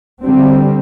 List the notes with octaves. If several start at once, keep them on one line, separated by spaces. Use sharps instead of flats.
D3 G3 C4